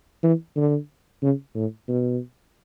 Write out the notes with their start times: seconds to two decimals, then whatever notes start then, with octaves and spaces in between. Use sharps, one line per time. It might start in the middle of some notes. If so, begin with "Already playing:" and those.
0.23 E3
0.56 D3
1.23 C#3
1.56 A2
1.88 B2